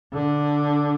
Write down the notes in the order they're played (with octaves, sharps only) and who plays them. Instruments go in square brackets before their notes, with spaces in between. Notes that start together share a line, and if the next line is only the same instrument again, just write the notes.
[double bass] D3